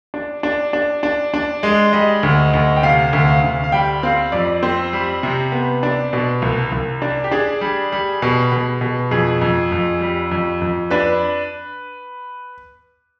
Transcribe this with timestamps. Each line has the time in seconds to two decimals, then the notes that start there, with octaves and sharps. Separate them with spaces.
0.14 D4
0.43 D4
0.73 D4
1.03 D4
1.34 D4
1.63 G#3
1.93 G3 D#5
2.23 D2
2.53 D2
2.76 G5
2.83 C3 F5
3.13 D2
3.28 F5
3.43 D2
3.64 F5
3.72 G3 G5
4.03 C4 F5
4.32 F2 D5
4.63 C4 C5
4.93 G3
5.23 C3
5.52 B3
5.83 D4
6.13 B2
6.42 C2
6.72 C2
7.02 D4
7.24 G4
7.31 D4 G#4
7.61 G3
7.92 G3
8.22 B2
8.52 B2
8.81 B2
9.11 F2 G#4
9.41 F2
9.72 F2
10.01 G3
10.31 F2
10.62 F2
10.90 D4 B4